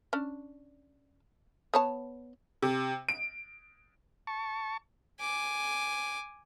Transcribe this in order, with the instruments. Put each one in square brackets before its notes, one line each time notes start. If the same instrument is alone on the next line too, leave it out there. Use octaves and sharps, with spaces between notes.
[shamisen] C#4 D4
B3 C#5 A5
[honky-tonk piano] C3
D7
[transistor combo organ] A5 C#6
[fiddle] G#5 D6